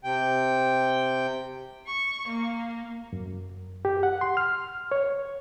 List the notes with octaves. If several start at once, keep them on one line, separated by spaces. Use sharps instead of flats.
C3 G5
C#6
A#3
F#2
G4
F#5
C6
F6
C#5